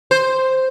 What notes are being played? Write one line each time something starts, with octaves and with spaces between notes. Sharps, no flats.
C5